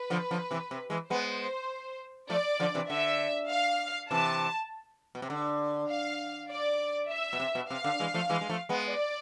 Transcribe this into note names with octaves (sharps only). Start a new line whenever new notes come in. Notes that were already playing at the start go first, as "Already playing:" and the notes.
Already playing: B4
D3 F3
D3 F3
C3 E3
C3
E3 G#3
G#3 B3 C5
F3 A3 D5
D3 F3
C3 E3
D3 E5
F5
C3 E3 A5
B2
C3
D3
F5
D5
E5
B2
C3
B2
C3 F5
D3
E3 G#3
F3 A3
E3 G#3
G#3
F3 A3
G#3 B3
D5